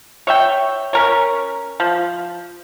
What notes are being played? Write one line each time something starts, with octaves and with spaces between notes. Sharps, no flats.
C#5 E5 G5
C#4 A#4 C#5
F3